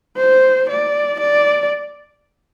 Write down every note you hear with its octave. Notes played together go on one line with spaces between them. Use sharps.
C5
D5
D5